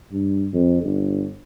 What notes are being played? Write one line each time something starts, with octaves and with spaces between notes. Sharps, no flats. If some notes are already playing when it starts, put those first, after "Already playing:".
G2
F2
G1